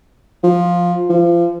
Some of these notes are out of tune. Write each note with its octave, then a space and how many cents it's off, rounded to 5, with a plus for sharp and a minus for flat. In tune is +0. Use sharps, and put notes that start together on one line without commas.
F3 +10
F3 -30